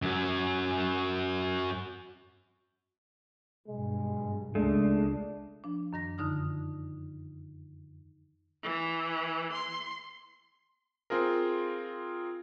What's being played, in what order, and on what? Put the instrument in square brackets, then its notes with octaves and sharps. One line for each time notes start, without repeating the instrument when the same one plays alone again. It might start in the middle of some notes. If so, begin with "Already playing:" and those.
[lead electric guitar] F#2 F#3
[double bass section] G2 B2 [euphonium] G#3
[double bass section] C#2 [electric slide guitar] G#3 A3 [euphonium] D4
[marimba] F3 D4
F#2 D#3 A#6
F2 D3 D#4 D#6 F6
[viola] E3
C6
[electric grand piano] C4 F4 G#4 A#4